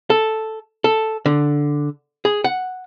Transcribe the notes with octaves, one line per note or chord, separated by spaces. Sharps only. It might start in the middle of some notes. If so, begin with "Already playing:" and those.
A4
A4
D3
G#4
F#5